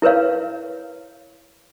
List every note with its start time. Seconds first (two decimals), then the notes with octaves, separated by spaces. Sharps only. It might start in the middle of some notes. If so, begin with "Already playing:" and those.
0.02 E4 A#4 B4 C#5 F5